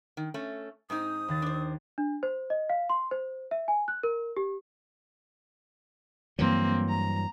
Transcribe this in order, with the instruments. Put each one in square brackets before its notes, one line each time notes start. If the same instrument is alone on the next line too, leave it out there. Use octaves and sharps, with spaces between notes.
[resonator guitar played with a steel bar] D#3
A3 C#4
[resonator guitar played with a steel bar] G#2 C4 D#4 [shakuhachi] D#6
[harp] D#2 D#3 A6
[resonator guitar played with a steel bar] D4 C5
[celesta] D4
C5
D#5
F5
C6
C5
E5
G#5
F#6
A#4
G4
[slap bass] G2 E3 F#3 [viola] A#3 C4
[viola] A#5